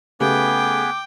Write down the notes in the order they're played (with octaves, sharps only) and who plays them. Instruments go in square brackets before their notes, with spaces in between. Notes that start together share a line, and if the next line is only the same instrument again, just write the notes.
[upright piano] C#3 A3 G4 [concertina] B3 G#4 B4 [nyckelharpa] G5 [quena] D6